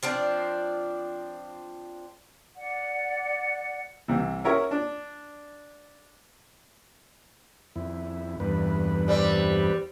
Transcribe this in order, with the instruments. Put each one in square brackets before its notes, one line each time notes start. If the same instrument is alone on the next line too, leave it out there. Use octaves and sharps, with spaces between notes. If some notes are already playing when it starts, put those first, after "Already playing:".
[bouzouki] F3 C4 D4
[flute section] D5 F#5
[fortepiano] C2 C3 E3
C#4 E4 F#4 A#4 C#5
D4
[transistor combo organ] F2 E4
E2 G2 B4
[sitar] G3 C4